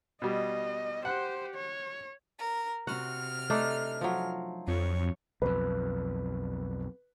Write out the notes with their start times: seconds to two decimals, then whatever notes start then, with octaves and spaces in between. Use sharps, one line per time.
0.22 B2 G3 D#5
1.05 G4 C5 F#5
1.55 C#5
2.38 A#4
2.87 C3 F#4 F#5 F6
3.50 A3 D4 D#4
4.01 F3 F#3
4.68 F2 C#5
5.42 B1 F2 B4